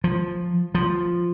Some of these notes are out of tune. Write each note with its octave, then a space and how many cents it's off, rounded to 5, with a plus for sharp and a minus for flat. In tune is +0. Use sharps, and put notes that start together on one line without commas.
F3 +5
F3 +0